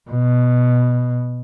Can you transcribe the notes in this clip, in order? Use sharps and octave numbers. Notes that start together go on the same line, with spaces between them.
B2